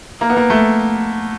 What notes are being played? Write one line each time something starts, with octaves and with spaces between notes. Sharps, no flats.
A#3
B3
A#3
A3